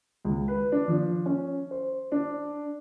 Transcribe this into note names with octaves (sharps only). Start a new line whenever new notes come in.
C#2
B4
D4
F3
C#4
C5
D4